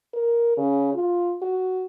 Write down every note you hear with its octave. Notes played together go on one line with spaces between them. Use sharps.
A#4
C#3
F4
F#4